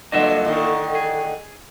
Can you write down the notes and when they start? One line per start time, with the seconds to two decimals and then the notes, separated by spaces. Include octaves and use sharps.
0.12 G2 D3 F#3 A#3 F4 D#5 E5
0.45 A2 D3 D#3
0.95 G#4